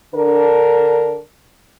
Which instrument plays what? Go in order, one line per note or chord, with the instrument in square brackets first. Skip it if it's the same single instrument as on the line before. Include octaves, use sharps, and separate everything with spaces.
[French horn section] D3 D4 A#4